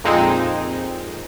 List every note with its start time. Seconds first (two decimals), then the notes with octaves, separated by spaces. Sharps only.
0.04 F2 A#2 G#3 C4 D#4